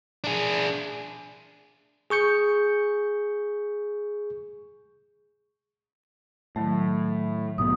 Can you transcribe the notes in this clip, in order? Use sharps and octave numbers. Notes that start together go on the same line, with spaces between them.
D4 G#4
G#4 C#6 G6 C#7
A2 D#3 F#3 A3
B1 G#2 B3 D#6